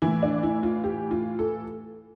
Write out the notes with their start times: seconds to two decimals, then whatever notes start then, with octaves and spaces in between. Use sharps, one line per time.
0.02 A2 E3 E4
0.23 D4
0.43 E4
0.63 F4
0.84 G4
1.11 F4
1.39 A4